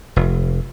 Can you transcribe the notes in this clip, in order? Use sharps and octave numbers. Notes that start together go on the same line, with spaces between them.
F1